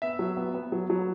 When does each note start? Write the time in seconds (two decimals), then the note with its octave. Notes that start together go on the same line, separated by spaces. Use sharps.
0.02 B3 E5
0.19 F#3
0.37 B3
0.54 B3
0.72 F#3
0.90 F#3